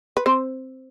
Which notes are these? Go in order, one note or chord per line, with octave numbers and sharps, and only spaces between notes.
B4
C4 C5